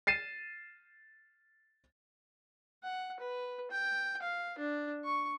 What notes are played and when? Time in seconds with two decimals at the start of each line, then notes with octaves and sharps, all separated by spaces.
0.07 A6 C7 D#7 E7
2.83 F#5
3.20 B4
3.71 G5
4.22 F5
4.58 D4
5.05 C#6